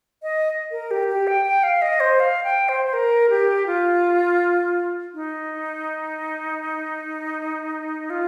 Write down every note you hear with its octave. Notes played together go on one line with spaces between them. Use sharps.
D#5
A#4
G4
G4
G5
G5
F5
D#5
C5
F5
G5
C5
C5
A#4
G4
F4
D#4
F4